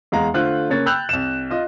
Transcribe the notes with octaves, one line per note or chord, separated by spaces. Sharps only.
E2 G#3 F5 A#5
D3 A3 F4 C5 F#6
C#3 A#3 C#5 A6
G5 B5 E6 F#6 G6 F7
C2 E7
F4 D#5